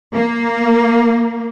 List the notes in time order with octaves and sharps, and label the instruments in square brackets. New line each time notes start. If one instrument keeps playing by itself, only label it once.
[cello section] A#3